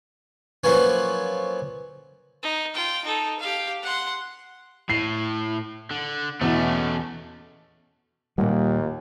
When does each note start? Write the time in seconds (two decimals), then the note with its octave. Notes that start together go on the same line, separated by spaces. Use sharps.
0.64 F3 F#3 A#3 B3 C#4
2.43 D#4
2.74 F4 G5
3.04 D#4 A4
3.40 G4 F5
3.83 F#5 C6
4.90 A2 C7
5.91 D3
6.41 E2 B2 A3 C#4
8.38 D#2 A#2 D#3 G3 F#5